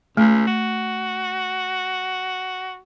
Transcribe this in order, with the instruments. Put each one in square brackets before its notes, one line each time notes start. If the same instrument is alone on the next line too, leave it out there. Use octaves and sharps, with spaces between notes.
[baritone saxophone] C#2 [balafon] A3
[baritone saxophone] F#4